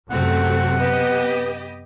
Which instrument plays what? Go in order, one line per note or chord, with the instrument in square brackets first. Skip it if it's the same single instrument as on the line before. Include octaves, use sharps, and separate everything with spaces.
[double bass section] F#2 C3 [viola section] A3 C4 F#4 [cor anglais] F#5
[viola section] B3 G4 D#5 [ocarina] B4